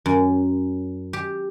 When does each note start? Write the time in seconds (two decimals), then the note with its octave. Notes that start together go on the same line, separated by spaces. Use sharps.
0.06 F#2
1.13 G4